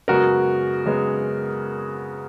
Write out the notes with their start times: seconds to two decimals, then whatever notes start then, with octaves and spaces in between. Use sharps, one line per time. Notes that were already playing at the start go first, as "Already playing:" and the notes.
0.08 F#2 C#3 G#3 B3 F#4 A#4
0.86 F#2 C#3 G#3 B3